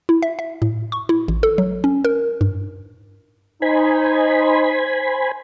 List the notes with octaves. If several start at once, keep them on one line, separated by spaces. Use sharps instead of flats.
E4
E5
E5
A2
C#6
E4
A1
A4
F#3
C#4
A#4
G2
D#4 C5 G#5 B5